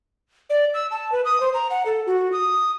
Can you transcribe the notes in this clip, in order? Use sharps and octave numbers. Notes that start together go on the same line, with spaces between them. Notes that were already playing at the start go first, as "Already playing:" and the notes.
D5
E6
A5
B4
D#6
C5
A#5
F#5
A4
F#4
D#6